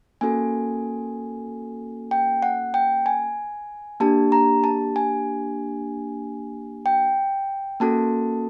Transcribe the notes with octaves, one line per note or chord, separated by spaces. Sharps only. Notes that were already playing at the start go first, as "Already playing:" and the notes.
A#3 C#4 F#4 A4 G#5
G5
F#5
G5
G#5
A#3 D4 G4 A5
A#5
A5
G#5
G5
A#3 C#4 F#4 A4 A5